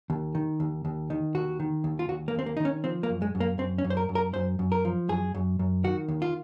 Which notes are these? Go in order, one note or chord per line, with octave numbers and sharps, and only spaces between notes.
D#2
D#3
D#2
D#2
D#3
D#2 F#4
D#3
D#2
F4
D#2 F#4
A#3
D#2 C4
A#3
D#3 D#4
C#4
F3 C4
A#3
F#2
G#3
F#2
A#3
F#2 C4
C#4
F#2
C5
A#4
F#2
A#4
F#2 C5
F#2
A#4
F3
F#2 G#4
F#2
F#2
D#3 F#4
D#2
F4